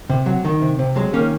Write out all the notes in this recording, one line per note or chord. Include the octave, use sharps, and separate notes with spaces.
C3
F#3
D#3
C3
C3
F#3 G#3
D#3 A#3 C#4